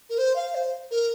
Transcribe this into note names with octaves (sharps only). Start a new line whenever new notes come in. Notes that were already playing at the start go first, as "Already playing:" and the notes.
A#4
C5
F5
C5
A#4